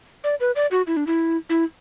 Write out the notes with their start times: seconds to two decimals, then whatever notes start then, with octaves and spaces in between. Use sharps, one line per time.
0.24 D5
0.40 B4
0.56 D5
0.71 F#4
0.87 E4
0.97 D4
1.07 E4
1.49 E4